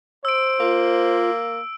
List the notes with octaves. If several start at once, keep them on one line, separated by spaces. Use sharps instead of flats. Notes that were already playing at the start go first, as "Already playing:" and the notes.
C5 E6 D7
A#3 F4